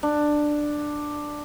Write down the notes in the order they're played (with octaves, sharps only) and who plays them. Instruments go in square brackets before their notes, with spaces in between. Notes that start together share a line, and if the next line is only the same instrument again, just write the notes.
[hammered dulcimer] D4